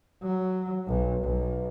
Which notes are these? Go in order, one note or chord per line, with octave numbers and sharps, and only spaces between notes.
F#3
B1
B1